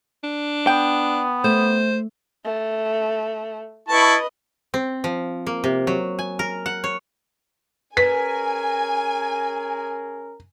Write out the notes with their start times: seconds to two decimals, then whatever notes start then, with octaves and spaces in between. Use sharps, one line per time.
0.24 D4
0.67 B3 G5
1.44 A3 C5
2.45 A3
3.89 E4 B4 D#5 A5 C#6
4.74 C4
5.04 F3
5.47 A#3
5.64 C3
5.87 F#3
6.19 G#5
6.39 A#4
6.66 F#5
6.84 C#5
7.97 C#4 G#4 A#4 B4 G#5 B6